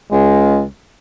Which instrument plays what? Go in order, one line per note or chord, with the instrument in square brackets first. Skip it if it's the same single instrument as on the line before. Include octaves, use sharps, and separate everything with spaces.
[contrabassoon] C#2 [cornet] G#3